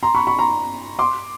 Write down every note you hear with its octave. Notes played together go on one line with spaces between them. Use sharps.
A#5 C6
B5 C#6
B5 C#6
A#5 C6
C6 D6